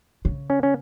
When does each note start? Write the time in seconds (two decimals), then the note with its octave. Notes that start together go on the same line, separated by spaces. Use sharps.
0.25 C#3
0.50 C#4
0.63 C#4